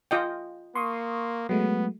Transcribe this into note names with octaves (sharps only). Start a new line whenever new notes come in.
F4 D#5 G5
A#3 C6 C#6 D#6
F#3 G#3 A3 B3